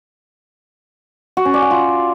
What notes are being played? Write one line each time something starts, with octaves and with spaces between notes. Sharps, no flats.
F#4
C#4
D5
F#5
F4